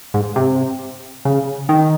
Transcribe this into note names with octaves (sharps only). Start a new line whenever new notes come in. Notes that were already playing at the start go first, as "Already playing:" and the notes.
G#2
C3
C#3
D#3